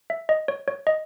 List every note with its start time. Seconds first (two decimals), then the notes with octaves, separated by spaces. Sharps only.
0.10 E5
0.29 D#5
0.48 C#5
0.68 C#5
0.87 D#5